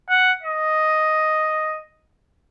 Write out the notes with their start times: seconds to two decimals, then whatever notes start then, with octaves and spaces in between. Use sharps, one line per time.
0.09 F#5
0.43 D#5